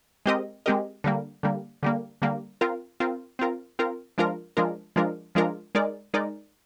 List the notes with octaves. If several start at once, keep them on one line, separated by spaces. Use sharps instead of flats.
G#3 C4 G4 A#4 D#5
G#3 C4 G4 A#4 D#5
D3 G3 A#3
D3 G3 A#3
D3 G3 A#3
D3 G3 A#3
C4 F4 A#4
C4 F4 A#4
C4 F4 A#4
C4 F4 A#4
F3 G#3 D4 F4 A#4
F3 G#3 D4 F4 A#4
F3 G#3 D4 F4 A#4
F3 G#3 D4 F4 A#4
G#3 D#4 A#4 D5
G#3 D#4 A#4 D5